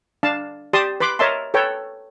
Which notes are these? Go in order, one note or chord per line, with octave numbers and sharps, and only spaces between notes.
D4 F5 A5
G4 D5 A5 C6 D#6
B4 B5 C6 D6
A#4 C#5 D#5 E5 A5 C6
A4 B4 C#5 G5